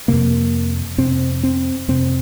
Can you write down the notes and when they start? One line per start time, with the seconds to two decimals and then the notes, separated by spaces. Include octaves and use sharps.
0.08 F2 C3 A#3
0.98 F2 C3 C4
1.43 C4
1.88 F2 C3 C4